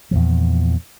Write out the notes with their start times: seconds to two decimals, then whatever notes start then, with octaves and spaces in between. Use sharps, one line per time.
0.11 E2 A#2 F3